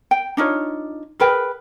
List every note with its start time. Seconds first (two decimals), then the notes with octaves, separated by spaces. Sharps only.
0.11 G5
0.37 D4 D#4 F4 C#5
1.20 G#4 A#4 B4 G5